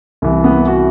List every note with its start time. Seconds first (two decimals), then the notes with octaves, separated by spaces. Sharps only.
0.22 C2 C3 E3
0.44 B3
0.67 F#4